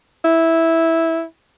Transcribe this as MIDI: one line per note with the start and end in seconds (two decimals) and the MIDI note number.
0.24 1.22 64